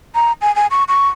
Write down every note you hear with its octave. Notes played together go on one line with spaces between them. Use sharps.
A#5
G#5
G#5
C#6
C#6